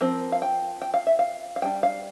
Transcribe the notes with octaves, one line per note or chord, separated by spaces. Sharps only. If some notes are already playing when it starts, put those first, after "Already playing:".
F3 C4 A#4
F5
G5
G5
F5
E5
F5
F5
G3 D4 G5
F5